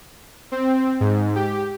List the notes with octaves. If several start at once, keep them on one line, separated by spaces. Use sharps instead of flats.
C4
G#2
G4